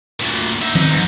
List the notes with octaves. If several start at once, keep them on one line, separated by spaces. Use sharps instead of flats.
D2 A#2
D#4 E5
D#3 F3 B3 C4 D#4
G#2